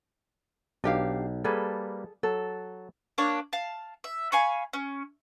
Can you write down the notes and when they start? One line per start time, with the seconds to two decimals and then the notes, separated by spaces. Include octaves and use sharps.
0.84 B1 D4 G4 F5
1.44 G3 A#3 G#4 A4 B4
2.23 F#3 A4
3.18 A#3 D4 C#5 F#6
3.53 F5 A5
4.04 E5
4.32 F5 G#5 B5 C#6
4.73 C#4